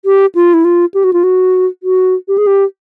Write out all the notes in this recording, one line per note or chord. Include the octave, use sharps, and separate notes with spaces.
G4
F4
E4
F4
G4
F#4
F4
F#4
F#4
G4
G#4
G4